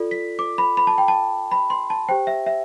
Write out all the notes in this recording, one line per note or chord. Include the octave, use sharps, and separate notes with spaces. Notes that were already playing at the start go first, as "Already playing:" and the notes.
Already playing: F4 A4 D5
B6
D6
B5
B5
A5
G5
A5
B5
C6
A5
G4 C5 G5
E5
E5